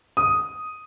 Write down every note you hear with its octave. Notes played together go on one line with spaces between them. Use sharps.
D#6